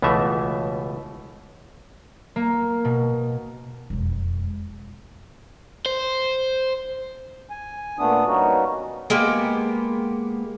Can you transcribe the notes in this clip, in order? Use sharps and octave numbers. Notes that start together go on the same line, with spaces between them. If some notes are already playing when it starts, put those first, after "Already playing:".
C#2 B2 E3 A3 E5
A#3
B2
E1 F2
C5
G#5
A#2 A3 B3 D4 D#6
G3 A#3 B3 C#4 D#4 F#4
G#3 A#3 B3 G4